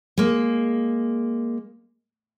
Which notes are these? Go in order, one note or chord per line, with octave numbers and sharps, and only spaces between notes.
G#3 A#3